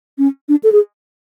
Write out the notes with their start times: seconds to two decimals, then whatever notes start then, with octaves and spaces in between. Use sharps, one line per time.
0.18 C#4
0.49 D4
0.63 A4
0.72 G#4